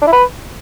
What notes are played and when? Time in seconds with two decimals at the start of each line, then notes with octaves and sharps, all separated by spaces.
0.02 D4
0.07 E4
0.12 B4